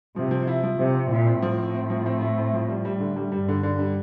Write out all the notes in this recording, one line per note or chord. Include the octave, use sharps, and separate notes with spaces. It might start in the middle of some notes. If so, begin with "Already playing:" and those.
C3 F3
F3
E4
F3
C3 F3
C4
A#2 E4
C4
A2 F3
C4
C4
F3
C4
E4
C4
F3
G3
G3
D3
G3
G2 G3
D3
D3
G3